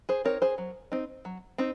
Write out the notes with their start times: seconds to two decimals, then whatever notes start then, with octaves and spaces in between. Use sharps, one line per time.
0.09 G#4 C5
0.25 C4 D#4 A#4 C#5
0.42 G#4 C5
0.58 F#3
0.92 C4 D#4
1.25 F#3
1.58 C4 D#4